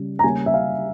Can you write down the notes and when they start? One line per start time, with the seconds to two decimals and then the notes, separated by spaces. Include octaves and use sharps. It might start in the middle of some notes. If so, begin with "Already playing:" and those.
Already playing: C#3 G3
0.19 A#5
0.24 C#3 G3 A#3 C#4 G#5
0.46 E5
0.54 F5